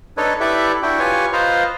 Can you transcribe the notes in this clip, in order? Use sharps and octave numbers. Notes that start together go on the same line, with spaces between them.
D4 D#4 A4 B4 C#5 D#5
E4 G4 A4 B4 D5 E5
D4 E4 F#4 G5
F4 G4 B4 C#5 G#5 C#6
F4 B4 C5 D#5 F5 A#5